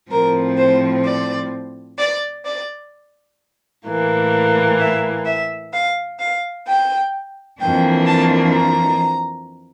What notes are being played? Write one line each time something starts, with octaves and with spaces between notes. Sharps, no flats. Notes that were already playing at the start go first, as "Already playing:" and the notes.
A2 F3 C4 A#4
C5
D5
D5
D5
A2 E3 A#3
E5
E5
F5
F5
G5
F2 E3 A#3 D4 G5
A5
A#5